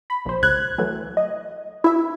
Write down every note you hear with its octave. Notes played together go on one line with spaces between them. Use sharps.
B5
A#1 C5
C#2 F#6 G#6
E3 F#3 A3
D#5
E4 E5